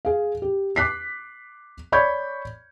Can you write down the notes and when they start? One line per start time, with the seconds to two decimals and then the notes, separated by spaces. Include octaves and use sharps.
0.05 G#4 F5
0.42 G4
0.76 D6 F#6 B6 C7
1.92 C#5 D5 B5 C#6 G6 G#6